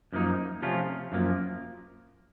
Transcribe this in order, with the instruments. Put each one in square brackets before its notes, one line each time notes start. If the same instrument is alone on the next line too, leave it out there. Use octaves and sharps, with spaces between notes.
[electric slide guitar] F#2 F3 A#3 D#4
C3 F3 A3 C#4 F4
F#2 F3 A#3